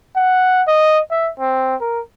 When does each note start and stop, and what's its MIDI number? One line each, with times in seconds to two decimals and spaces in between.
0.16 0.63 78
0.68 1.01 75
1.11 1.31 76
1.40 1.76 60
1.81 2.01 70